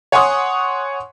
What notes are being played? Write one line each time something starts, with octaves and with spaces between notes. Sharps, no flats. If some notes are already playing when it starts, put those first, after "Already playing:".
C#5 F#5 G#5 C6 C#6 D#6